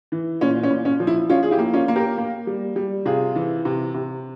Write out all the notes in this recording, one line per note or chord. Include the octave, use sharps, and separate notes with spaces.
E3
A#2 C#4
C#4
A#2
C#4
F3
E4
F3 C#4 F4
G#4
E4 G4
A#3
C#4 F4
A#3
G4 A#4
A#3
G3
G3
C3 F4 G#4
E3
C3
C3